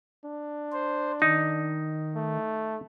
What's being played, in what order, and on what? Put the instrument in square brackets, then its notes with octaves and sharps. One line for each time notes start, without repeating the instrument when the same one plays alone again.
[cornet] D4
[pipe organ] C5
[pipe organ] D#3 [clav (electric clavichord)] D#4
[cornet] A3